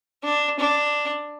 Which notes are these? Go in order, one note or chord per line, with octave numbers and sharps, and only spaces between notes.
D4
D4